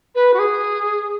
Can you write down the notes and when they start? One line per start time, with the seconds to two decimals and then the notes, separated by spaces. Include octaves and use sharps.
0.15 B4
0.33 F#4
0.38 G#4